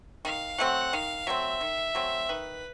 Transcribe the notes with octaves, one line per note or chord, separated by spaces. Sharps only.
D#3 F5
F#3 A3 C4 F#5
D#3 F5
F#3 A3 C4 E5
D#3
F#3 A3 C4
D#3 B4